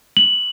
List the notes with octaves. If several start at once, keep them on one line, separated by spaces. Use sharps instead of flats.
F#7